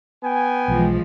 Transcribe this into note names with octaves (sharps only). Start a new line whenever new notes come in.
B3 G5 G#5
B1 E3 F3 G#3